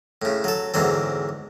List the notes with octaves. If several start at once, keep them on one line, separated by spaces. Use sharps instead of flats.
A2 C#3
F#3 A4
E2 G#2 D3 F#3 C4